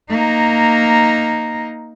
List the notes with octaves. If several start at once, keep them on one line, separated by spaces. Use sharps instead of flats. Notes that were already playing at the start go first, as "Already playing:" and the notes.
A#3 D#4